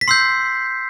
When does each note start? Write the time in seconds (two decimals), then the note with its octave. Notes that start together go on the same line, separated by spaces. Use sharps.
0.01 B6
0.08 C6 E6 G6 C7